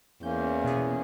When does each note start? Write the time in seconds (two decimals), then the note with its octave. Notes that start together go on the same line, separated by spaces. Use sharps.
0.23 E2 A#3 C#4 G6
0.64 B2 B3 G#4